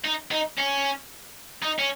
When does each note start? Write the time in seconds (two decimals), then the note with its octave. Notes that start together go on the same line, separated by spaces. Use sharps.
0.04 D#4
0.31 D#4
0.58 C#4
1.63 D#4
1.79 C#4